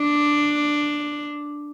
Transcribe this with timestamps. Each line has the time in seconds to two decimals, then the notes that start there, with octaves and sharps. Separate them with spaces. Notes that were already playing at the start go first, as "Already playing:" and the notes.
Already playing: D4